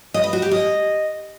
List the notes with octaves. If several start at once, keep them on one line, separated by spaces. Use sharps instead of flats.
D#5
B4
F#4
G4
D#5